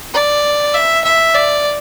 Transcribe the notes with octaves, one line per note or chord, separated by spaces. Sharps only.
D5
E5
E5
D5